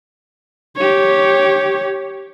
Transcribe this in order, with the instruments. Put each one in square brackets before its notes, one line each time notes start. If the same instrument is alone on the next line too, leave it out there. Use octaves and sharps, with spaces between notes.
[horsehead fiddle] G4 C#5